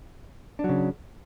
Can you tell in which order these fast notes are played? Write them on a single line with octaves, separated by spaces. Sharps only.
D4 F#3 C#3